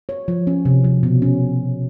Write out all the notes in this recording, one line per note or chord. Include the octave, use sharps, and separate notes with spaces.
C#5
F3
C#4
C3
F3
B2
C#4